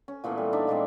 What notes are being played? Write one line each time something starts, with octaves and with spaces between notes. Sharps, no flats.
C#4
A#2 E3 A3 B3
G3
D4 D#4 D5 E5
A#2 E3 G#3 C4